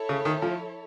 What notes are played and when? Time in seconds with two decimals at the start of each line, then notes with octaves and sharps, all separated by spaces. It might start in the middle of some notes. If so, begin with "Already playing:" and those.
Already playing: E4 A4 C#5
0.09 C#3
0.25 D#3
0.42 F3